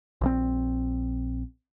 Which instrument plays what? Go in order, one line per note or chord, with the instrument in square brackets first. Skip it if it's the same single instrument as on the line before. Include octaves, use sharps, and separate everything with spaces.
[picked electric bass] A#1 E3 C4